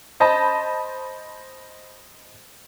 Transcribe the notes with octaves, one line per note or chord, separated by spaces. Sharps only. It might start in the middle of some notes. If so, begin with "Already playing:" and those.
C5 D#5 A5 B5